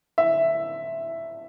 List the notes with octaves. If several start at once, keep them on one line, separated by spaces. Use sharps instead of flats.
E5